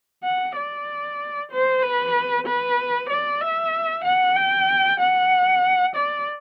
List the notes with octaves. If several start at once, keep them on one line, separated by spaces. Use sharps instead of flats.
F#5
D5
C5
B4
B4
D5
E5
F#5
G5
F#5
D5